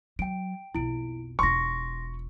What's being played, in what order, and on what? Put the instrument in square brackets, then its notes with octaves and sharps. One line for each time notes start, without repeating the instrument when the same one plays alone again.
[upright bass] F#3 [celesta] G5 D7
[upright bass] B1 F2 [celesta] E4 D7
[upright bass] E1 F4 [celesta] C6 A#6 [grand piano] C#6